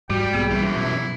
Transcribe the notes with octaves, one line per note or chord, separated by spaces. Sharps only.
G#2 G3 F#4 G5
B1 A#3 B3 G4 G#4
F#2 E3 G3 G#3 B3
B2 E4